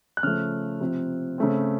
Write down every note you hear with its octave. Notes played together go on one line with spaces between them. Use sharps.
F#6
C#3 F3 A3 F6
C3 F3 C4
C#3 A3 C4